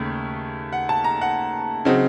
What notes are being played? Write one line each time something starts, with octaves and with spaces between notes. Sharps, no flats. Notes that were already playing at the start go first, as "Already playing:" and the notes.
Already playing: D#2 C#3 A3
F#5
A5
A#5
F#5
C#3 F#3 C4 D#4